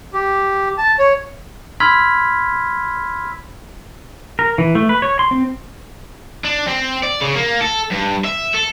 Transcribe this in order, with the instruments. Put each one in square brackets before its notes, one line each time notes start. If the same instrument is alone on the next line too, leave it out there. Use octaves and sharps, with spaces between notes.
[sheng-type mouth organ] G4
A5
C#5
[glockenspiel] B5 C6 E6 F6 G#6 B6
[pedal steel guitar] A#4
E3
A3
B4
C#5
C6
C4
[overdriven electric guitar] D4
C4
D5
C#3
A#3
A4
G2
E5
A4